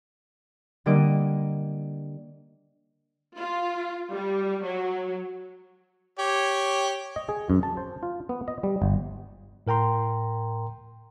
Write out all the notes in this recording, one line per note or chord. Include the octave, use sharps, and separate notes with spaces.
D3 G3 A#3 D#5 D7
F4
G3
F#3
G4 C#5
D#5
G#4
F#2
A5
C5
F4
B3
D#5
G3
G1
A2 A#4 G5 A#5 C6